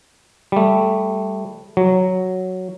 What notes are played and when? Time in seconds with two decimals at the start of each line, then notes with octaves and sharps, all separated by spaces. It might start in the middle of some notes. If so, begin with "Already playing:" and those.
0.52 G3 A3
1.77 F#3